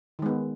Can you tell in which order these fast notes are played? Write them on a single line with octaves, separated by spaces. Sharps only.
D#3 G#3 B3